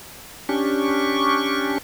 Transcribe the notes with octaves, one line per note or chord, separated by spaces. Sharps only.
C#4 D4 G4 C#6